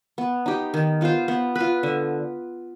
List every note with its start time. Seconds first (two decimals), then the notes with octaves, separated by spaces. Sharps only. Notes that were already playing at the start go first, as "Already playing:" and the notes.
0.18 B3
0.46 D#4 G4
0.74 D#3
1.01 B3 F4 C5
1.28 B3
1.56 F4 B4
1.83 D3